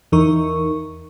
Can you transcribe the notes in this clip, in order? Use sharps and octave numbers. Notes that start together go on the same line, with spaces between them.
E2 E3 D#4 A#4 C#6